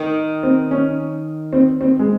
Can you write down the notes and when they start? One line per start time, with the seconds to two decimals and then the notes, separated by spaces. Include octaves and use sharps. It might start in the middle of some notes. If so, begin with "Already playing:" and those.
Already playing: D#3
0.43 C4
0.71 C#4
1.53 C4
1.81 C4
1.99 G#3